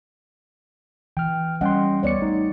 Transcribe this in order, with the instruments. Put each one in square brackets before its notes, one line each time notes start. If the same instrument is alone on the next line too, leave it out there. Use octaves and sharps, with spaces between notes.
[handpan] E3 [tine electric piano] G5 F6
[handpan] G3 D#5 F#5 [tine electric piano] C#4 G5 C6
[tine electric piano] D2 B3 C#7 [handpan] C#5 D5
[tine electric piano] A1 A3 D#4